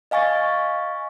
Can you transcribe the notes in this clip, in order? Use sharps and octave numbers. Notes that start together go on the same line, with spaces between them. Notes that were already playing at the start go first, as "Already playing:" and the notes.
D#5 F5 G#5 C#6 A6